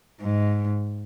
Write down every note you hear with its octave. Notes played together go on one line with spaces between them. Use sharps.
G#2